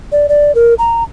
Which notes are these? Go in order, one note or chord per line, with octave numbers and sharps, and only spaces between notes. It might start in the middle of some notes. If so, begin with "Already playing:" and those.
D5
D5
A#4
A#5